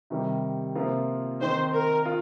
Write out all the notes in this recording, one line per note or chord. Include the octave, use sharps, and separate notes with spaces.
C3 D#3 G3
C3 F3 A#3 F4
D#3 C4 D#4 C5
A#4
F4